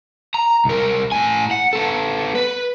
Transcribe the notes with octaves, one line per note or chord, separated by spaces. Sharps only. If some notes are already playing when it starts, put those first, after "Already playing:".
A#5
C2 A#4
A2 G#5
F#5
B3 A4
B4